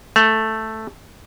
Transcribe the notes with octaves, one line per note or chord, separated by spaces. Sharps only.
A3